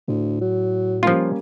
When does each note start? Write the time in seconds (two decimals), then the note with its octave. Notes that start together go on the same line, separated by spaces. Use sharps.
0.08 D2 A2
0.41 F#3
1.03 F3 G3 A#3 C#4 F4